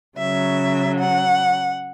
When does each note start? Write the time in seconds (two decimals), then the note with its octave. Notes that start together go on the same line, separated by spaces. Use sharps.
0.18 C#3 F#3 E5
0.99 F#5